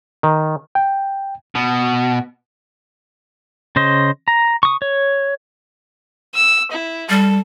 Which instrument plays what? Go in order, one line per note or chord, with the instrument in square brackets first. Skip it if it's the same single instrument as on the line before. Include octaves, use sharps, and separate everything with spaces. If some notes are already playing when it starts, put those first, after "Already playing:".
[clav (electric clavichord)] D#3
[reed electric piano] G5
[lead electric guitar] B2
[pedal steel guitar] C#3 C5 D#5
A#5
C#6 D#6
C#5
[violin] E6
E4
[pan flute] G3 [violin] A4